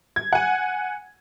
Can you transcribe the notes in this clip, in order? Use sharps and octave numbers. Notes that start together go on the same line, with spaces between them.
G#6
F#5 G#5